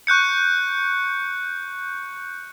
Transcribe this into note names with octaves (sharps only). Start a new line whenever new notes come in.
C#6 F#6 G6 C#7